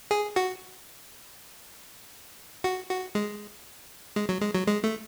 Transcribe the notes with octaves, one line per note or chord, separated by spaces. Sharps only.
G#4
F#4
F#4
F#4
G#3
G#3
F#3
G#3
F#3
G#3
A3